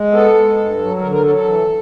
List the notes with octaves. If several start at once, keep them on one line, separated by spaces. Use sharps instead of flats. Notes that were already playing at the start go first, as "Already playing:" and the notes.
Already playing: G#3
B3 A4
G#3
G2
F#3
D3 A#4
A#4
F#3 A4
A4
E3